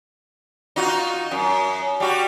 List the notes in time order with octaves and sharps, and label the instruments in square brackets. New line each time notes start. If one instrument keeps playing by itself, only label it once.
[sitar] D#4 F4 F#4
F#2
G3 F#4